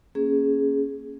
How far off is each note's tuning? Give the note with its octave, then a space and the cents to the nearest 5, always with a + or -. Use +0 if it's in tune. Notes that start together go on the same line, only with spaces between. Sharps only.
A#3 +0 C#4 -5 G#4 +0